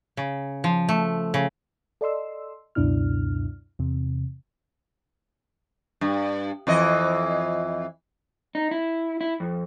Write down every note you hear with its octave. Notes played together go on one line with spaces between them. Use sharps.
C#3
F3
A3
C#3
A4 D5 D#5 C6 E6
C#2 F#2 B2 D4 E4 F6
E2 C3
G2
F2 E3 D#5
D#4
E4
E4
F2